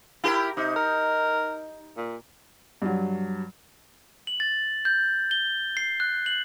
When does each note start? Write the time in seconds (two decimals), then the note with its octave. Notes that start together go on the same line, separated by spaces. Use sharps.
0.24 E4 G4 A#4
0.57 C3 D#4
0.76 A#4
1.97 A#2
2.82 G2 F#3
4.27 F#7
4.40 A6
4.85 G6
5.31 G7
5.77 C7
6.00 F#6
6.26 F#7